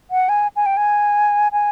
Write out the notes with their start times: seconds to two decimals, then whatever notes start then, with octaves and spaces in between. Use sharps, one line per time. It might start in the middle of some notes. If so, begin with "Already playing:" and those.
0.11 F#5
0.29 G#5
0.56 G#5
0.66 G5
0.77 G#5
1.52 G#5